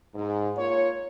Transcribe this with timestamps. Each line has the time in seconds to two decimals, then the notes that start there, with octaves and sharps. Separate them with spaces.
0.15 G#2
0.58 A#3 F4 C#5